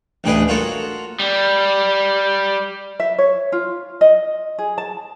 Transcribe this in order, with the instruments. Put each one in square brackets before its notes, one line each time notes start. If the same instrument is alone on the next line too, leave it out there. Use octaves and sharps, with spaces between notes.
[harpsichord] A1 D2 G4 G#4 B4 D#5
A#3 F4 F#4 A4 C#5
[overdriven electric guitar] G3
[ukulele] E5
C#5
F4
D#5
G#4
A5